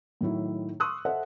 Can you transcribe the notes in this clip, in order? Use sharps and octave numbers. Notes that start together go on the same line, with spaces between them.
A2 D#3 F#3 E4
C6 C#6 D#6 E6 F#6
A4 C5 D#5 E5 F#5